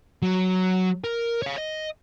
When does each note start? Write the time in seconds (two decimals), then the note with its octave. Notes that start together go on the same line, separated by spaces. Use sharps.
0.22 F#3
1.04 A#4
1.42 C#5 F5
1.58 D#5